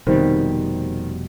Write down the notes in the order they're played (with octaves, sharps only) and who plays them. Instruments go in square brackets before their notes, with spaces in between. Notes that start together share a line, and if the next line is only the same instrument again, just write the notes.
[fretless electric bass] F1 B2 G3 [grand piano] D#3 C4